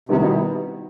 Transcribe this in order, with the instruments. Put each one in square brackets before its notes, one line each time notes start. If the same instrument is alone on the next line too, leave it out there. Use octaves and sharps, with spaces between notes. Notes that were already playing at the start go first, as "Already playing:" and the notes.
[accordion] C3 [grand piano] D#3 G3 B3 E4 G4
[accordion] B2